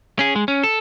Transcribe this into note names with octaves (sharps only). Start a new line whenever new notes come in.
C#4 G#4
G#3
C#4
A4